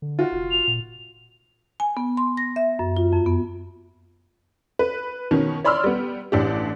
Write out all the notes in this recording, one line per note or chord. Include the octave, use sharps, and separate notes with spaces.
D3
F4 F#4
F1
F7
A#2
G#5
B3
C6
A#6
E5
F#2
F4
F2
B3
B4
B2 D#3 C#4
C#5 D5 B5 C6 E6 F6
G3 B3
A1 D4 G4